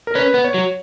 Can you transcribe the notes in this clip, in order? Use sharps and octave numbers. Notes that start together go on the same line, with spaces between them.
A#4
C#4 B4
B3
C#5
F#3